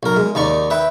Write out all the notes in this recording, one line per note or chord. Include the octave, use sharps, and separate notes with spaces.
B1 A#4
G#3
D#2 D#4 D5 C#6
B4 E5 G5